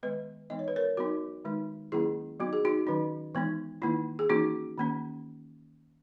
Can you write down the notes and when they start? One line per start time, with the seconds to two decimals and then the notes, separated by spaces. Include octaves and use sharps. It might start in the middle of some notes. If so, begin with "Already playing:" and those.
0.03 D#3 G#3 B3 B4 D#5
0.50 E3 G#3 B3 D#4 D#5
0.59 C#5
0.68 B4
0.76 A#4 C#5
0.97 F#3 B3 D#4 F#4 A#4
1.45 D#3 G#3 D#4
1.92 D#3 F#3 A#3 C#4 E4 G#4
2.40 F#3 B3 D#4 F#4
2.53 G#4
2.65 D#4 F#4
2.87 D#3 F#3 C#4 D#4
3.35 E3 G#3 B3 D#4
3.82 D#3 A#3 D#4 E4
4.19 G#4
4.30 E3 A#3 C#4 D#4 F#4
4.78 D#3 A#3 C#4